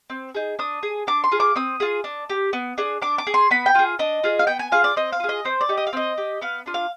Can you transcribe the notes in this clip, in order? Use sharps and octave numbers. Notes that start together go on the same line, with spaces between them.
C4
D#4 G#4
D4 D#6
G#4
D4 D6
C6
F4 G#4
D6
C4 D#6
F4 G#4
D4
G4
B3
D4 G#4
D4 D6
D6
G#4
C6
B3 B5
G5
F4 G#4
D4 D#5
F4 G#4
F5
B3 G5
G#5
F4 G#4 F5
D5
C4 D#5
F5
F4 G#4
D#5
C4 C5
D5
D#4 G4
D#5
F5
C4 D#5
G4
B3 F5
D4 F4
F5